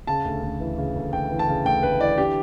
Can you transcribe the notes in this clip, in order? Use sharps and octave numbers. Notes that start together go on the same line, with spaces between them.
C#3 A5
D2
D2
E3
C#3
D2
D2 G5
E3
A5
C#3
D2 G5
D2 B4
E3 D5
D3 G4